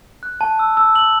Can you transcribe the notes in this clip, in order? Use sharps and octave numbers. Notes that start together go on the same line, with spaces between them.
F#6
A5
E6
E6
F#7